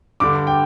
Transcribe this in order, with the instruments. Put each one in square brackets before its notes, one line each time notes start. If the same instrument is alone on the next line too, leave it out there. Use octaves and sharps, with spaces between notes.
[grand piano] G2 D3 D6
G5